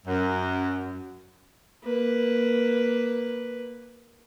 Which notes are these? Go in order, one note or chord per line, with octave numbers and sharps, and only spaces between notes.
F#2
A#3 B4